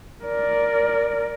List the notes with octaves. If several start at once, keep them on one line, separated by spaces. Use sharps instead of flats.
A#4 D5